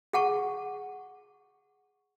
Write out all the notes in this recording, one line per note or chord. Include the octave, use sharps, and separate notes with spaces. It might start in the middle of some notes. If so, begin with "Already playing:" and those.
G#4 F#5 A5 C#6